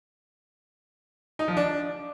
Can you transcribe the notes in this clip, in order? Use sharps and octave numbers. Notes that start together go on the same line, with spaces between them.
D#4
F3
D4